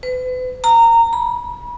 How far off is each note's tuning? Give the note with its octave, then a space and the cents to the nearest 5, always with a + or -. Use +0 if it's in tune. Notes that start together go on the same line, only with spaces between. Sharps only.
B4 +40
A#5 -20
B5 -35